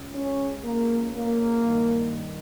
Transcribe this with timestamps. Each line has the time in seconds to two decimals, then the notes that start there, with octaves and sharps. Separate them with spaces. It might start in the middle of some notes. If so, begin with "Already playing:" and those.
Already playing: C#2 C#3
0.13 C#4
0.63 C#2 C#3 A#3
1.14 A#3
1.64 G2 D#3